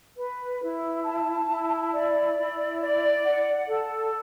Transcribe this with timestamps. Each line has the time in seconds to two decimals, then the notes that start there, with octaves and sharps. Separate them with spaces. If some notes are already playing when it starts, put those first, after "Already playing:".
0.17 B4
0.61 E4
1.05 A5
1.49 E4
1.93 D5
2.37 E4
2.81 D5
3.25 F#5
3.69 A4